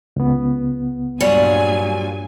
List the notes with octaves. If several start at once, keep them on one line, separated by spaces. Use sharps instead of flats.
C#2 B3
G2 A#2 F#3 G3 G#5